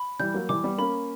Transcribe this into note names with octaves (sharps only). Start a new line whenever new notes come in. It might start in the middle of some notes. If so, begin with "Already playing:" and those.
Already playing: B5
E3 G3 G6
F#3 A#3
E3 G3 D6
G3 B3
A#3 C#4 B5